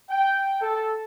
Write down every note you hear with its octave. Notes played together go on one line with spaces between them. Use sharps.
G5
A4